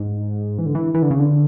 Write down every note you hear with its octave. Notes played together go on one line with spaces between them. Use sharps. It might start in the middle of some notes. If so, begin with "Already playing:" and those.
Already playing: G#2
E3
D3
E3
E3
D3
C#3
D3